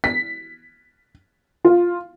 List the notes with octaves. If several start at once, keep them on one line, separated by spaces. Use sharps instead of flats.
B6
F4